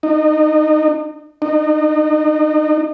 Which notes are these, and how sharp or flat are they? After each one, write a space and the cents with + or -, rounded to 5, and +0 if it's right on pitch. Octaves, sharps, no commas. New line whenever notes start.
D#4 -30
D#4 -35